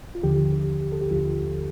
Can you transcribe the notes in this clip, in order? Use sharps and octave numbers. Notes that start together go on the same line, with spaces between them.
F4
D#2 D3 F3 G4
G4
G4
A4
G4
D#2 D3 F3 F4